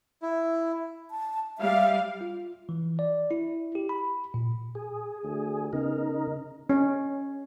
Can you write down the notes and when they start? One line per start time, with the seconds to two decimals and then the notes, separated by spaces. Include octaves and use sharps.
0.22 E4
1.11 A5
1.58 G3 E5 F5
2.21 F4
2.69 E3
2.99 D5
3.31 E4
3.75 G4
3.89 B5
4.34 A#2
4.75 G#4
5.23 D2
5.73 C#3 B3 D#4 A#4
6.70 C#4